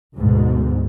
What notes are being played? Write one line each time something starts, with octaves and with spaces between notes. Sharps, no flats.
D2 G#2 B2